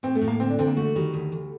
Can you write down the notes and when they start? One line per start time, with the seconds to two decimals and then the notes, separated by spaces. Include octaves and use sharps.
0.03 A2 C4
0.15 A3
0.21 A2
0.28 A#3
0.40 D3 C4
0.49 D4
0.59 D3 C4
0.68 A#3
0.77 A3 F#4
0.95 D#3 G3
1.13 D2
1.32 D2